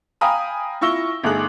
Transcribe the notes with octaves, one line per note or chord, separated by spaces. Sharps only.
F5 G5 G#5 A#5 B5 D#6
E4 F4 C#6 E6 A#6 G7
G1 A3 D#4 G#4 F#6 F#7